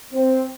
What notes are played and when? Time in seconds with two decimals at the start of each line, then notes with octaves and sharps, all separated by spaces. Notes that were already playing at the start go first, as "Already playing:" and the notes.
0.12 C4